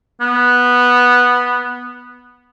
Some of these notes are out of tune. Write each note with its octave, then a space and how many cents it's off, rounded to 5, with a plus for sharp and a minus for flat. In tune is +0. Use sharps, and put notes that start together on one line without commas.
B3 -5